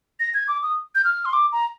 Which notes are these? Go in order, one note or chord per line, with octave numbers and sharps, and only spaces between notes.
A#6
G#6
D6
D#6
G6
F6
C6
D6
A#5